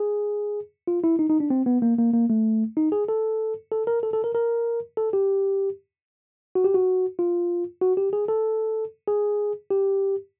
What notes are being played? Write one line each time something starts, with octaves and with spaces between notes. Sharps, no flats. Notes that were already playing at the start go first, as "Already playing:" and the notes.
Already playing: G#4
F4
E4
D#4
D#4
D4
C4
B3
A#3
A#3
A#3
A3
D#4
G#4
A4
A4
A#4
A4
A4
A#4
A#4
A4
G4
F#4
G4
F#4
F4
F#4
G4
G#4
A4
G#4
G4